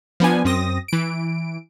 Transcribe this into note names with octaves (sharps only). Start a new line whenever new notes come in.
F3 B3 D4 G#5
F#2 C4 D#6 A#6
E3 D7